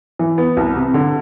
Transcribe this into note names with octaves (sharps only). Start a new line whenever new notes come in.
E3
B3
C2
C3
D3